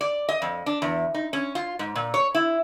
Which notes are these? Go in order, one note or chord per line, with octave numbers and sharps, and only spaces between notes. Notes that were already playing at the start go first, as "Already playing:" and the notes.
D5
D#5
F2
D4
E2
D#4
C#4
F4
G#2
A#2
C#5
E4